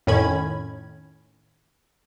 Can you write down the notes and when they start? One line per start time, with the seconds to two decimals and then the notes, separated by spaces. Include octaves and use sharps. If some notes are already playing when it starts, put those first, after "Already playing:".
0.07 F2 A2 D#3 C#4 B5 G#6